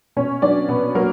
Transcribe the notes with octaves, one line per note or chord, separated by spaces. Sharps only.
B2 C#4 C#5
F#3 D4 D5
B2 B3 B4
F#3 A#3 A#4